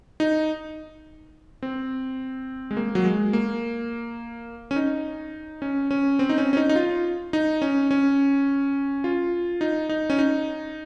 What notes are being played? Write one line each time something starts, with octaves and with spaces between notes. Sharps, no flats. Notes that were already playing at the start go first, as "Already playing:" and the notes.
D#4
C4
G#3
A#3
F#3
G#3
A#3
C#4
D#4
C#4
C#4
C4
D#4
C#4
C#4
D#4
D#4
F4
D#4
C#4
C#4
F4
D#4
D#4
C#4
D#4